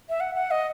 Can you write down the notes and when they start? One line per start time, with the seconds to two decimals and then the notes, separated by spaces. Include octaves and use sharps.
0.09 E5
0.20 F#5
0.35 F#5
0.51 D#5